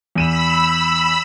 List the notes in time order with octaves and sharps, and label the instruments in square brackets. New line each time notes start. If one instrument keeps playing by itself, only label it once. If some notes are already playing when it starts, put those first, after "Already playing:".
[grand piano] E2 D#7 E7 [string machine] B5 E6